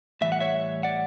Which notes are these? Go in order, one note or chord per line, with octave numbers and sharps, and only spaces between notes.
A2 E3 G3 E5
F#5
C#5 E5
D5 F#5